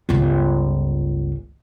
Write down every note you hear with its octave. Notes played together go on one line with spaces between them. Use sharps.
G1 C#2